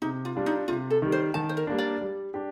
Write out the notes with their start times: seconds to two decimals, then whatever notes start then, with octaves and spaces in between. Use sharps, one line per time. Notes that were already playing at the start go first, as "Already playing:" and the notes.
0.02 C3 D#4
0.25 F4
0.35 G3 D4 F4
0.46 D#4
0.68 C3 F4
0.90 A4
1.02 D#3 G3
1.12 C5
1.34 D#3 A5
1.49 C5
1.57 A#4
1.67 G3 A#3 D4
1.78 D5
2.01 G3
2.34 D4 G4